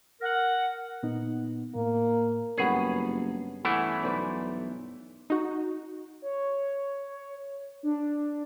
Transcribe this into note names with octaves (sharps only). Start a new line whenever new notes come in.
A#4 F#5
A#2 B3 D#4
A2 A#3
F#1 G2 B3 G#4 C#5
E3 A3 B3 C#4 E4
B1 B4 C5 D5
D#4 F#4
C#5
D4